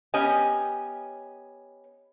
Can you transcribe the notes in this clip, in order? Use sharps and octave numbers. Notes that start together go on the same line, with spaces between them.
B3 C#4 G4 D#5 G#5